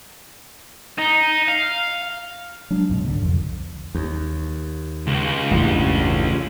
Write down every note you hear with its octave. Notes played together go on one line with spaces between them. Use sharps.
D#4
F5
F#3 G#3 D4
C#2 G#2 B2
D3
C2 F2
D#2
C#2
A1 E2 G2